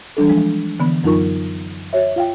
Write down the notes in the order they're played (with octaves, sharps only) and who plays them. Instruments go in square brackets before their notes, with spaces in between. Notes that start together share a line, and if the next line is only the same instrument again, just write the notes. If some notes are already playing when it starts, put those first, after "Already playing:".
[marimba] E3 G3 D4 A4
F3 G#3
D3 E3 B3 B5
F#2 F#3 D#4 F4 A#4 C#6
F#4 C#5 E5
F4 F5 G5